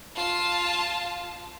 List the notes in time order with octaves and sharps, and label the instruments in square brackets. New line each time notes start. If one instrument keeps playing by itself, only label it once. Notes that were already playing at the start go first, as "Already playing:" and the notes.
[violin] F4 A5